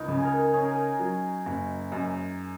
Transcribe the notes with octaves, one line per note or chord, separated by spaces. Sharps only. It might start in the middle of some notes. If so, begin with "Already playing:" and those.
Already playing: C#2 D#4
C#3
G#4
A#4
C#4 G#4
A#4
G#4
F#3
F#1
F#2